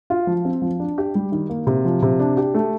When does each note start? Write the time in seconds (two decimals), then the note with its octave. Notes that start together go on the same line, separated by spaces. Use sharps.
0.10 F4
0.27 F3
0.45 C4
0.62 F3
0.80 D4
0.98 G4
1.15 G3
1.32 D#3
1.50 A#3
1.67 C3
1.85 F3
2.02 C3
2.20 D4
2.37 G4
2.54 A3